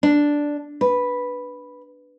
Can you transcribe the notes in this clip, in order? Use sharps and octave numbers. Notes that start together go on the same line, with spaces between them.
D4
B4